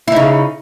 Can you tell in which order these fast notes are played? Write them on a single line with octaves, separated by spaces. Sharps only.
E4 D#4 C#3